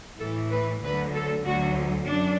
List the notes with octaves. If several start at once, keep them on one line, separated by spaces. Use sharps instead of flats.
A2 E3 A4
B4
D2 D3 F#3 B4
A4
D2 D3 F#3 F#4
F#2 D4